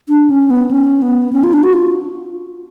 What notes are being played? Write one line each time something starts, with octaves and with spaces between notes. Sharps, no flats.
D4
C#4
B3
C#4
B3
C#4
F4
D4
F#4
F4